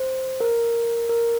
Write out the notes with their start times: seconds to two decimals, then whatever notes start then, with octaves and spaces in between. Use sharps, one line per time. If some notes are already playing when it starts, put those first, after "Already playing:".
Already playing: C5
0.40 A#4
1.09 A#4